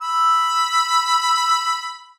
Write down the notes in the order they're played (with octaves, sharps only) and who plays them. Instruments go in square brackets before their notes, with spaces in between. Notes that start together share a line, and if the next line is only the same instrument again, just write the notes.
[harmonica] B5 E6